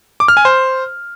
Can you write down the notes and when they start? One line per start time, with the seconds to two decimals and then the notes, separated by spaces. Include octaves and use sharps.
0.20 D6
0.28 F6
0.37 G#5
0.45 C5